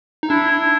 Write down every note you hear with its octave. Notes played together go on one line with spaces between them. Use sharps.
D#4
D4 E4
E4